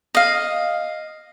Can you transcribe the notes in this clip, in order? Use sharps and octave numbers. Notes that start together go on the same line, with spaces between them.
D#5 F5